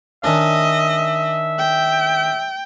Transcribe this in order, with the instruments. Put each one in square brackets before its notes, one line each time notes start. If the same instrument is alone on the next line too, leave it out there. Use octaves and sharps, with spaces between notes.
[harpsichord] D#3 C#4 D4 [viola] D#5 [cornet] E5
[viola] G5